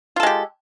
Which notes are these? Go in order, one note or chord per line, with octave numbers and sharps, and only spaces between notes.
G#3 F4 G4 A4